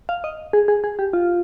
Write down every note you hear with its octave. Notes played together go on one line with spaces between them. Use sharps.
F5
D#5
G#4
G#4
G#4
G4
F4